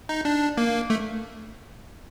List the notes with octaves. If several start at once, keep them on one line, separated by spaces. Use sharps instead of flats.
D#4
D4
A#3
A3